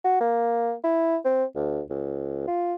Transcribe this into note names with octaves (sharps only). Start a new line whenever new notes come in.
F#4
A#3
E4
C4
D2
C#2
F4